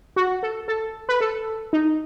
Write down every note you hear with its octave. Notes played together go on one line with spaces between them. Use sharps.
F#4
A4
A4
B4
A4
D#4